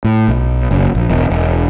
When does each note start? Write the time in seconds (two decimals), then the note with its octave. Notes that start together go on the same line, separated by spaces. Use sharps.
0.04 A2
0.28 B1
0.71 F#1
0.95 A#1
1.10 E1
1.30 E1